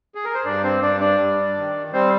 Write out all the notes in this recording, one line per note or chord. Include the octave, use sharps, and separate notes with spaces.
G#4
A#4
C5
G2 D4 D5
C4 C5
G2 D4 D5
D4 D5
G3
D#3
G3 C4 C5